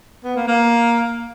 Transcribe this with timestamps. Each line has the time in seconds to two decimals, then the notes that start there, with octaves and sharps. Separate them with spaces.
0.24 B3
0.36 A#3
0.47 A#3